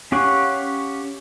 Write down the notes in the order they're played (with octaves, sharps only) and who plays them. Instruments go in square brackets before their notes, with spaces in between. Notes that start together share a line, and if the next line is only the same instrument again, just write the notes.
[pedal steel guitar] C#4 G4 F5 F#5 C#6